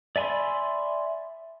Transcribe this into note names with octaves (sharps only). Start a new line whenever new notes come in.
D5 E5 G#5 B5 C6